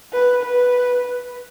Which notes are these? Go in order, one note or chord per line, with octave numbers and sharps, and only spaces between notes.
B4
B4